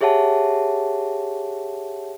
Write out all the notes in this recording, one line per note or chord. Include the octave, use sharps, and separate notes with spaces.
G4 G#4 C#5 E5 F#5 A5